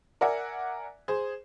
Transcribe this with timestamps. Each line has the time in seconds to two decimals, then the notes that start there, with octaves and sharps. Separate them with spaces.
0.21 A#4 D5 E5 F#5 G#5
1.08 G#4 C5